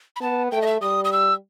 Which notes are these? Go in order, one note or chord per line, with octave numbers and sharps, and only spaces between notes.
B5
B3 A5
A3 G5
D#5
E5
G3 D#6
D#6
E6